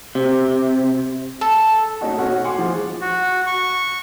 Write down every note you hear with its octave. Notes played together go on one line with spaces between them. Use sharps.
C3
A4
A3 C#4 D#4 F#4
B2 C#4 F#4 C#6 F6
F#5 G#5 C6 D6
F3 G#3
F#4
C#6